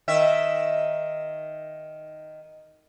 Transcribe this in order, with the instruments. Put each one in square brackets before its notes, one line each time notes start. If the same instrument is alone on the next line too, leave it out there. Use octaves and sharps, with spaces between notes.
[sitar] D#3 E5